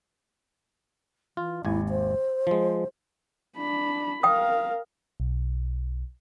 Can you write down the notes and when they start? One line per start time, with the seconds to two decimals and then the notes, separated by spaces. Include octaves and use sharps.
1.37 E3 F4
1.65 G#1 D#2 E4 G#5
1.90 C5
2.47 F3 G#3
3.57 D4 B5
4.23 A#4 F5 G5 D#6
5.20 B1